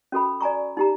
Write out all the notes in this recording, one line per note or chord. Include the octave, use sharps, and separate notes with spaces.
C#4 F#4 A4 B5
D5 G#5 A#5 C#6
D#4 G4 A#5